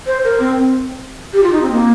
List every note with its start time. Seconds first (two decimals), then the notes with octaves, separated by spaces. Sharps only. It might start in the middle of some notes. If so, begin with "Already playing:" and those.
0.07 C5
0.24 A#4
0.40 C4
1.33 G4
1.43 F4
1.52 D#4
1.62 C4
1.71 A#3